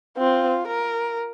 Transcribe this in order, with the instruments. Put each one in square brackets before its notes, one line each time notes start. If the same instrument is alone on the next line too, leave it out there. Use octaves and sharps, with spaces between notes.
[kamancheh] C4 [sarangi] F4
[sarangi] A#4